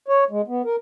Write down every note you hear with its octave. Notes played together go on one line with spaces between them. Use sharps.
C#5
G#3
B3
A#4